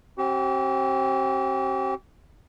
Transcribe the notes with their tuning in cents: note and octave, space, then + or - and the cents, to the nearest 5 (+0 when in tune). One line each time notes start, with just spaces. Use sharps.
C4 +35 G4 -40